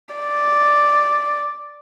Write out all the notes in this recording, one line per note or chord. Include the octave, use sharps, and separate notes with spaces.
D5